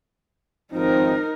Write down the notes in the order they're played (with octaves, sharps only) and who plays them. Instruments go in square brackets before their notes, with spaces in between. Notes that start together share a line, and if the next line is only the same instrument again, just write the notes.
[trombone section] G#1 F3 C4 [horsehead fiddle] D#4 A#4